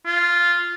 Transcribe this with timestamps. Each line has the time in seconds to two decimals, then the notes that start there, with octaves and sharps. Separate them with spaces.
0.06 F4